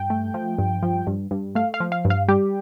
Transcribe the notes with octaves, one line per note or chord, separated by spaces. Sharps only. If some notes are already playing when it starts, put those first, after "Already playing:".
Already playing: G2 G5
A3
F3
G2
F3
G2
G2
A3 F5
F5
F3
F5
G2
F5
G3 G4